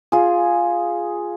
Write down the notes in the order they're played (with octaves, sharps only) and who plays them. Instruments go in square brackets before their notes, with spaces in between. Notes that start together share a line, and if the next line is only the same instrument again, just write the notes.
[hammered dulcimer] F4 G#4